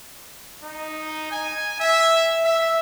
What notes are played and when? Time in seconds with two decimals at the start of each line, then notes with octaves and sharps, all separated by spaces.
0.63 D#4
1.32 G#5
1.80 E5
2.44 E5